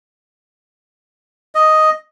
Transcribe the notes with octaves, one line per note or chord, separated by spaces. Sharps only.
D#5